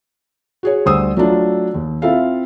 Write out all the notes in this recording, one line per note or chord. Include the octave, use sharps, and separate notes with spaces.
F#4 G#4 C#5
D2 G3 C5 D#6 E6
F#3 A3 D4 F4
D#2
C4 E4 F4 A4 E5 F5